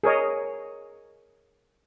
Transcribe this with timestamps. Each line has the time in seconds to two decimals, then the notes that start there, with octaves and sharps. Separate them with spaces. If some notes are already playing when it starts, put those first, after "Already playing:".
0.03 G#4 A#4 C#5 D#5